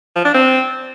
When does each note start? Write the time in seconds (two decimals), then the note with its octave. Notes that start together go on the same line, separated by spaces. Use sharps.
0.16 F3
0.25 D4
0.34 C4